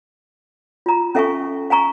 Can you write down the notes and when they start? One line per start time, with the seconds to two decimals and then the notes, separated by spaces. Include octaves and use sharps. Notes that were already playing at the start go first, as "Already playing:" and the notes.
0.86 F4 A#5
1.15 C#4 A4 E5 F5 G#5 C#6
1.70 F5 G#5 A#5 C#6